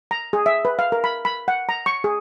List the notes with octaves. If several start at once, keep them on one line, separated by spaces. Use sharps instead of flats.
A#5
G#4
E5
B4
F5
A#4
B5
B5
F#5
A#5
C#6
G#4